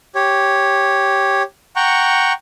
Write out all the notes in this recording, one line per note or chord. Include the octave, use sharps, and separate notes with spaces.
G4 C#5
F#5 G5 A#5 C#6